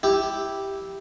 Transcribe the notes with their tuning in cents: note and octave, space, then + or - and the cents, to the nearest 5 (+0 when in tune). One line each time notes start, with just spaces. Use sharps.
E4 -5 G4 +0